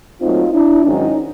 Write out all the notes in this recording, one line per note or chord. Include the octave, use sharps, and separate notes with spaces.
A#2 F#3 A3 C4 D#4 F4
D4 E4
G#2 D#3 F#3 C#4 D#4